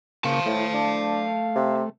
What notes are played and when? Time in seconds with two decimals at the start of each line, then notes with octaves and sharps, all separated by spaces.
0.24 C#3 A#3 F5 A5 C#6
0.46 A2 A3
0.74 D4
1.55 C3